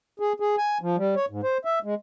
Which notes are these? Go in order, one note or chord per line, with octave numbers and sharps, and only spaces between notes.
G#4
G#4
G#5
F3
G3
C#5
G#2
C5
E5
G#3